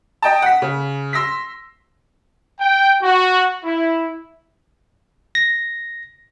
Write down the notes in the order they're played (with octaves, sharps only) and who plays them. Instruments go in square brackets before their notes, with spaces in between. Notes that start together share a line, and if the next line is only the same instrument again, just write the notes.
[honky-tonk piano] D#5 G5 A5
F#5 B6
C#3
C6 E6 A#6 B6
[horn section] G5
F#4
E4
[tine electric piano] A#6